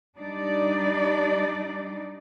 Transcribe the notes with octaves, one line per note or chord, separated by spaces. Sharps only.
G3 D4 D#4 D5